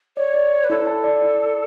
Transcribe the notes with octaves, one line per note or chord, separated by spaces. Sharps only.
C#5 D5
D5
D5
B4
E4 A4
A5
D5
E4
D5